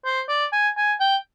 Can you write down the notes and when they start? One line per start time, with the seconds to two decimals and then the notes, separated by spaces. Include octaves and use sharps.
0.05 C5
0.29 D5
0.53 G#5
0.77 G#5
1.00 G5